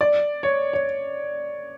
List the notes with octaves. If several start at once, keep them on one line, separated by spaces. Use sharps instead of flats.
D5
C#5
C#5